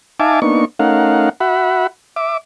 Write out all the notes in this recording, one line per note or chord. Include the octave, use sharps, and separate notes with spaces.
D#4 E5 F5 G#5 A5 D6
A#3 B3 D4 D#4 C#6
A3 C#4 D#4 A#4 F5 F#5
F#4 E5 F#5 B5
E5 D6